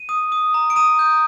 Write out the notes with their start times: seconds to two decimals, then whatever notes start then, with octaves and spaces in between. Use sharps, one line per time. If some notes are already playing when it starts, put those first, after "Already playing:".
Already playing: D#7
0.09 D#6
0.32 D#6
0.54 A#5
0.70 D7
0.76 A#5 D#6 D#7
0.99 G6